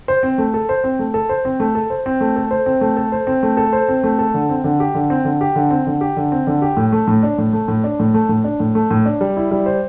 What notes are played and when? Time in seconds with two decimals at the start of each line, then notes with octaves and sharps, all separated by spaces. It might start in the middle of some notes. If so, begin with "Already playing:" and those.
0.08 C5
0.23 C4
0.38 A3
0.54 A4
0.69 C5
0.84 C4
0.99 A3
1.14 A4
1.29 C5
1.45 C4
1.60 A3
1.75 A4
1.90 C5
2.06 C4
2.21 A3
2.36 A4
2.51 C5
2.66 C4
2.81 A3
2.97 A4
3.12 C5
3.27 C4
3.43 A3
3.57 A4
3.73 C5
3.89 C4
4.04 A3
4.19 A4
4.34 D3
4.49 C4
4.64 D3
4.80 G4
4.95 D3
5.10 C4
5.25 D3
5.41 G4
5.56 D3
5.71 C4
5.87 D3
6.01 G4
6.16 D3
6.32 C4
6.47 D3
6.62 G4
6.77 A2
6.92 A3
7.07 A2
7.23 D4
7.38 A2
7.53 A3
7.68 A2
7.84 D4
7.99 A2
8.14 A3
8.29 A2
8.44 D4
8.60 A2
8.75 A3
8.91 A2
9.06 D4
9.21 G3
9.37 E4
9.51 G3
9.66 C5